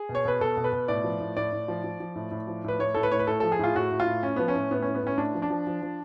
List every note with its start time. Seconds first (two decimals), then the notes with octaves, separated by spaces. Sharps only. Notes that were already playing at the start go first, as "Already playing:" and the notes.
Already playing: G#4
0.09 B2
0.15 C#5
0.25 B2 B4
0.41 B2 A4
0.57 B2
0.64 B4
0.73 B2
0.88 A2 D5
1.04 F3
1.20 A2
1.37 A2 D5
1.53 A2
1.68 F3
1.84 F3
2.00 F3
2.15 A2
2.31 A2
2.47 F3
2.64 A2 B4
2.79 A2 C#5
2.94 A2 A4
3.03 B4
3.12 A2 C#5
3.19 B4
3.27 A2 A4
3.40 F3 A4
3.52 G#4
3.59 A2 F4
3.75 A2 F#4
3.91 A2
4.00 F4
4.07 A2
4.23 A2 C#4
4.36 F3 B3
4.48 C#4
4.55 A2
4.71 A2 B3
4.82 A2 C#4
4.94 B3
5.03 A2 C#4
5.18 A2 D4
5.34 F3
5.42 D4
5.50 F3
5.67 F3
5.82 F3